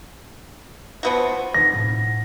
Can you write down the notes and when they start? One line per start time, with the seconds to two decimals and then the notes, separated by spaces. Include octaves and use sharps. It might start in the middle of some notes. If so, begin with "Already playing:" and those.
1.03 F3 B3 F#4
1.54 C4 D#4 A#6
1.73 A2